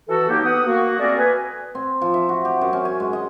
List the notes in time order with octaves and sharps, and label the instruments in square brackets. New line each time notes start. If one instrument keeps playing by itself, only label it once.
[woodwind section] E3 F#4 A4
F#3 A#3 D#4 G4
B3 F#5 D#6
A#3 F#4
A3 C4 F#4 G#4 A#4 D5
B4 G#5
[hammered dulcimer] C4
F3
E5
F#4
G4
F#2
C#4
G#5
G#3
D#5